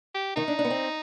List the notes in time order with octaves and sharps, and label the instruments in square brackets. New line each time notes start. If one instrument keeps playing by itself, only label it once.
[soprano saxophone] G4
[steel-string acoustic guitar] D#3 [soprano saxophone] D#4
[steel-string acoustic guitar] D4
D4
B3
C4